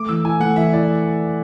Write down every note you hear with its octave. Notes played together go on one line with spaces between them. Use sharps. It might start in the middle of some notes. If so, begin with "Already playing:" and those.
Already playing: A3 D6
E3 E6
E4 G#5
A3 F#5
E3 E5
E4 D5